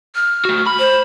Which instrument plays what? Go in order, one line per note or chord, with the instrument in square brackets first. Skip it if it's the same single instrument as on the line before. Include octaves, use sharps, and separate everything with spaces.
[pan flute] F6
[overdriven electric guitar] A3 F#4
B5
[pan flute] C5